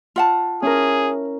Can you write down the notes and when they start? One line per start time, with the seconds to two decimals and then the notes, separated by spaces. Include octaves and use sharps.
0.16 F4 F#5 A5
0.62 C#4 E4 G#4 A#4